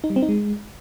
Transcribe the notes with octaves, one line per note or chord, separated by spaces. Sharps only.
D#4
G3
C4
D#4
G#3